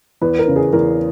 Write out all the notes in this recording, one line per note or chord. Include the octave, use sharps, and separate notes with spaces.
E2 B3 B4
A#4
C#3
G#4
E2 A#4